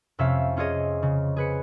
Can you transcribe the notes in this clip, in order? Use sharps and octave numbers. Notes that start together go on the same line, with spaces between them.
F2 C3 C#4 E5 F5
C#4 F4 G#4 C#5 D#5
C#3
G#4 B4 C#7